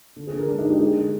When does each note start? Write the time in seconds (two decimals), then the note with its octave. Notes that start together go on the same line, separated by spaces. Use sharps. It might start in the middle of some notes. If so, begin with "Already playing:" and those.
0.16 D3
0.27 G#4
0.33 D3
0.38 A#4
0.48 G#3 D4
0.59 D#4
0.65 G#3
0.70 G4
0.80 G#3 G#4
0.96 D3